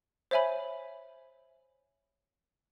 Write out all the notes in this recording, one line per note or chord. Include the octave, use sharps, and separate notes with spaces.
C5 C#5 E5 G#5 B5